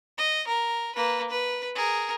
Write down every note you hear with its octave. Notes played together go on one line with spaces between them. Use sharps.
D#5
A#4
A#3 B4
B4
G#4 A#4